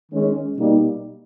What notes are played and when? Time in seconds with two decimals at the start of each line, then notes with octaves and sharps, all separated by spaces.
0.12 D#3 G#3 C#4
0.57 B2 G3 A#3 D#4